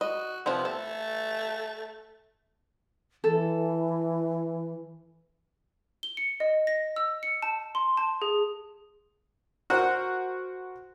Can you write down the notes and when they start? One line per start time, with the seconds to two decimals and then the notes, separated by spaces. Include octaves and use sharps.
0.01 F#4 D#5
0.46 C3 F3 B3 C4
0.65 A3 A4
3.24 E3 A4
6.03 G7
6.17 C#7
6.40 D#5
6.67 A#6
6.96 E6
7.23 C#7
7.42 A5
7.75 C6
7.97 A5
8.22 G#4
9.70 F#4 A#4 C5 F#5